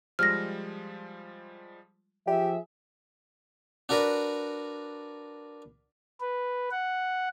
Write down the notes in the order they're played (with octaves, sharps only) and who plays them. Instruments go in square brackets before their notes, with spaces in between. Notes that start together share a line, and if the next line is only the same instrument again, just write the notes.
[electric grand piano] F3 G3 G#3 [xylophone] F6 A#6
[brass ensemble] F3 G#4 E5 [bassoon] G4
[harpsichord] D4 F#4 A#4 B4 D5
[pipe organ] B4
F#5